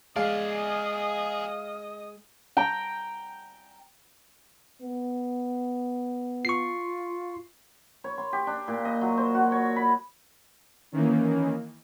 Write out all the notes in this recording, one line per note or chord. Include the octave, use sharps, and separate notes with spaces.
G#3 G#4 D5 D#5 F5
G5 A#5
B3
F4 C#6 C7
C#5
C6
G4
D4
A#2
D#5
F#3
C5
F#4
C#5
B5
D#3 E3 A#3 C#4